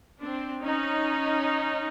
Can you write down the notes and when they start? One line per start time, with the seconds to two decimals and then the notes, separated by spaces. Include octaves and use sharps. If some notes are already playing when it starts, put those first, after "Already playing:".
0.21 C4 D4
0.63 C#4 D#4